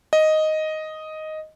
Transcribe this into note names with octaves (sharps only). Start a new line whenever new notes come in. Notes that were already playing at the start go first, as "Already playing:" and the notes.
D#5